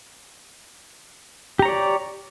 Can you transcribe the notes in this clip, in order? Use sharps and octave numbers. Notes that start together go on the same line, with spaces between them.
G4 C#5 D5 A#5